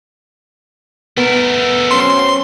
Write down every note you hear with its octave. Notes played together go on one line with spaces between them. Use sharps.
A3 B3 A#4
F#3 C4 C#4 C6